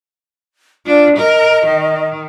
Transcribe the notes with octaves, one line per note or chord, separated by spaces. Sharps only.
D4 F4
A#4 D#5
D#3